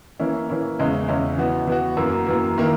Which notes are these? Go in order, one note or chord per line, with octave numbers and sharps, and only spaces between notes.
E3 A#3 C#4 E4
E3 A#3 C#4 E4
E2 C#3 G#3 C#4 E4
E2 C#3 G#3 C#4 E4
E3 B3 F#4
E3 B3 F#4
F#2 E3 A#3
F#2 E3 A#3
D#3 A#3 E4